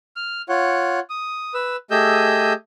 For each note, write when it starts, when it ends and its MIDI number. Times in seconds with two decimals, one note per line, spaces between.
0.16 0.42 89
0.49 1.00 65
0.49 1.00 73
0.49 1.00 78
1.10 1.54 87
1.54 1.76 71
1.54 1.76 88
1.91 2.53 57
1.91 2.53 67
1.91 2.53 68
1.91 2.53 75
1.91 2.53 88
1.91 2.53 91